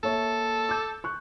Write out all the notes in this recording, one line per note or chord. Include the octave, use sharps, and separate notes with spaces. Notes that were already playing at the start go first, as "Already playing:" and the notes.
A#3 A4 C#5 E5
D6 G6
C#6 F#6